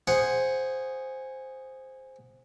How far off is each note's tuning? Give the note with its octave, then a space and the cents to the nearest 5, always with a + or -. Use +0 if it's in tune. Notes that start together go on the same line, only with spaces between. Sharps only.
G#4 -10 C5 +0 F#5 +0